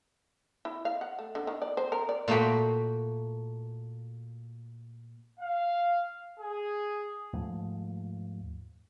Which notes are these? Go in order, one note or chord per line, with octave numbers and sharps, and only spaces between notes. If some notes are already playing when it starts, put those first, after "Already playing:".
E4
F5
F#5
A3
D3
D#3
D5
C5
A#4
D5
A#2 A3 A#3 F#4 G5 B5
F5
G#4
D#2 G#2 F3 A3